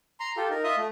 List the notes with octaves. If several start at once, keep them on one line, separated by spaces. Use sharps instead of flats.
A#5 C6
F4 G4 A4
D#4 A#4
F4 D#5 E5 D#6
A3